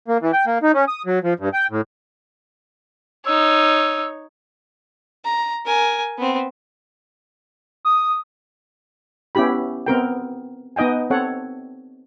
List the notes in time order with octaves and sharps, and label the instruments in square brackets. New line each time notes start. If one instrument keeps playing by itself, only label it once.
[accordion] A#3
E3
G5
A#3
D#4
C#4
D#6
F#3
F3
G2
G5
A2
[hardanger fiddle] D#4 C#5 [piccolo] E6
[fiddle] A#5
A#4 G#5
B3 C4
[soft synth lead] D#6
[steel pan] B3 C#4 E4 G4 B5
B3 C4 A#4 G5
B3 D#4 D#5 G5 G#5
C4 A4 C#5 F#5